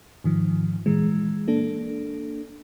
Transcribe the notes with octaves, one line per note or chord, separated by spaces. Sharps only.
G#2 D#3 F3
A#2 E3 G#3
A#3 D4 A4